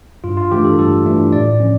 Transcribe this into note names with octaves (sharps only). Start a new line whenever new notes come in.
G2 F4
F4
E3 A3 D4 G4
A4
G2 A4
E3 A3 D4
A2 D5
F3 C#4